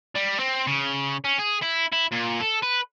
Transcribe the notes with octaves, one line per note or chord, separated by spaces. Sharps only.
G3
C4
C#3
C#4
G#4
E4
E4
A#2
A4
B4